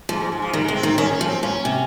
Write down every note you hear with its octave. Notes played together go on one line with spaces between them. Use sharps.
G#2 F3
G#2
G#2
F3
D#3 G3
G#3
C3
C4
D#3
C4
D#3 C#4
C#4
F3
C4
A#2 C#4
C3